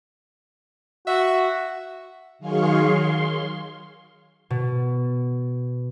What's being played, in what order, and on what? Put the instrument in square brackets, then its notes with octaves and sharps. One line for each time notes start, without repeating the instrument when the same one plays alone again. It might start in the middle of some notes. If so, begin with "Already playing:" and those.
[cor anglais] F#4 [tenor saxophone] E5
[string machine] D#3 F#3 G#4 F5 C6 C#6
C6
[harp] B2